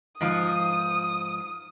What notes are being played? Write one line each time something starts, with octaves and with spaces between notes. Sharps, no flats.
G#2 F3 D#6